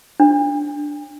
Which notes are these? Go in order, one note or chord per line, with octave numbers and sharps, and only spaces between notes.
D4